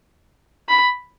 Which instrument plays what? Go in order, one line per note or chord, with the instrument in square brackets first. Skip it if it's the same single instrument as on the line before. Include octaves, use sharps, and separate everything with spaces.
[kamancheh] B5